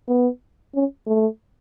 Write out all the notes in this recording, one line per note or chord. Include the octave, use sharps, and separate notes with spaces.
B3
C#4
A3